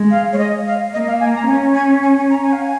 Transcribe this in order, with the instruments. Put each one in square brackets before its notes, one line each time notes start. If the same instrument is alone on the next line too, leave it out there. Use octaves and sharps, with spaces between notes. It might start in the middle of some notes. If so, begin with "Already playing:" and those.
Already playing: [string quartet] G#3
[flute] F5
C#5
D#5
F5
[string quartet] A#3 [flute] D#5
[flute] F5
G#5
A#5
[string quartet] C#4 [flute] G#5
[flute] G#5
G#5
G#5
A#5
G#5
F5
G#5